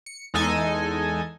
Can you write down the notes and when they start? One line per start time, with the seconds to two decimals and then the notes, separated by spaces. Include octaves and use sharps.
0.06 C#7
0.34 E2 G#3 D#4 A4 D#5 G#5